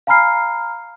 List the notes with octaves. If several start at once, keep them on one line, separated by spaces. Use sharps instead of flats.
F5 G#5 A#5 B5 F6 C7